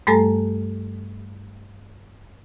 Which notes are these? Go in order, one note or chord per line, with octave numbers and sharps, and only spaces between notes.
G2 G3 A3 A4 G#5 A#5